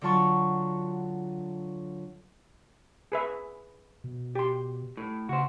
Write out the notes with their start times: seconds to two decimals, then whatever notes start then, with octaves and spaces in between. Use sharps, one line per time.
0.01 D3 F#3 F4 A5 C#6
3.12 G#4 B4 E5
4.04 B2
4.35 G4 C6
4.97 A2
5.29 C#3 F#4 C5